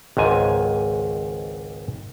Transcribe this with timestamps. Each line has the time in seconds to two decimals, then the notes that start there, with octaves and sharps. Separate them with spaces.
0.17 G#1 C#2 G#2 G#5